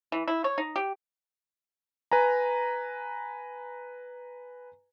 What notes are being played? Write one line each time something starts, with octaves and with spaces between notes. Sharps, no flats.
E3
E4
C#5
D#4
G4
B4 G#5 A#5